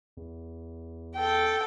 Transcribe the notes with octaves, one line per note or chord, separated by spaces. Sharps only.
E2
A4 G5